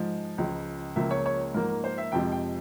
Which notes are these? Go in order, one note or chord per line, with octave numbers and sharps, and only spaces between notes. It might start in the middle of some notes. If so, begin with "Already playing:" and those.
Already playing: G#2 F3 G#3
C#2 C#3 F3 G#3
C#2 C#3 F3 A#3 E5
C#5
C#5
G#2 F3 A#3 A#4
A#4
C5
E5
F2 C3 F3 G#3 G5
G5